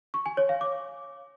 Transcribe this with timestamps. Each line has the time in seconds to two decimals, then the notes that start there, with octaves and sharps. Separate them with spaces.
0.14 C#6
0.26 G#5
0.37 C#5
0.49 F5
0.61 D6